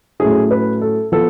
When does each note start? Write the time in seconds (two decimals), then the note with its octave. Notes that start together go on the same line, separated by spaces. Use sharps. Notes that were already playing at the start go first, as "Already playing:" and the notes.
0.20 A2 F#3 A3 C#4 G#4
0.51 B4
0.81 A4
1.12 F3 B3 A4